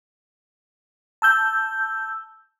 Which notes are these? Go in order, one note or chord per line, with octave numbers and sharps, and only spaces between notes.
A5 E6 G6